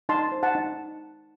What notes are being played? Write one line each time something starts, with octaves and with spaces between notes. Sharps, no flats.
D#4 A5 C6
C5
F#5 A5
D#4